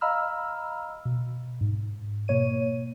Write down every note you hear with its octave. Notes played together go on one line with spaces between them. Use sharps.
D#5 F5 A#5 B5 E6 F6
B2
G#2
B2 A#3 C#5 D#7